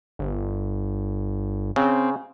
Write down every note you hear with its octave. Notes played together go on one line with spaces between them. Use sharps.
G1
C#3 C4